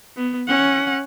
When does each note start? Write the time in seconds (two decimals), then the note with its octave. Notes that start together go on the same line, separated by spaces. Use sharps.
0.16 B3
0.48 C#4 F#5